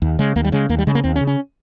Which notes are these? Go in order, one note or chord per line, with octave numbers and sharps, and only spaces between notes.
D#2
C#3 G#3
D#2 A#3
G3
C#3 G#3
D#2 A#3
G3
C#3 G#3
A#3
D#2 C4
C#4
C#3
C#4